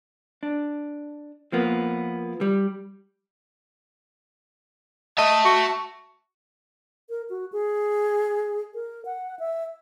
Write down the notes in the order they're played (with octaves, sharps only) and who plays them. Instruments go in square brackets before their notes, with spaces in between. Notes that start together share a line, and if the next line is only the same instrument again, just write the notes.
[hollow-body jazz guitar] D4
F3 A#3 B3
G3
[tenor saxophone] D#5 [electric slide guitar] E5 A5
[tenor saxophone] F#4
[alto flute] A#4
F#4
G#4
A#4
F#5
E5